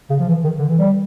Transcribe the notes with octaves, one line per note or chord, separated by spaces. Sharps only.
C#3
F3
E3
D#3
D3
E3
G3